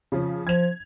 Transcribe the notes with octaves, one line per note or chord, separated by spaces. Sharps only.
C#3 F3 C#4
F3 G#6 F7